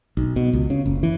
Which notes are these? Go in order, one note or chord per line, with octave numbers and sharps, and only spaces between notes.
B1
B2
C#2
C#3
F#1
E3